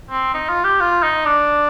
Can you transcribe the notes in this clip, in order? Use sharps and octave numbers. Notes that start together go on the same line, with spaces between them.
C4
D#4
F4
G4
F4
D#4
D4